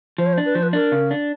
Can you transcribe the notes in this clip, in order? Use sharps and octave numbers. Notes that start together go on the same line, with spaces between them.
F3 C5
C#5
C5
D4
B4
F3 C5
B4
D4 A#4
C#3
D4